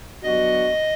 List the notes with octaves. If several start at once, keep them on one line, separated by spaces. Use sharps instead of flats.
F#3 B3 D4 F#4 D#5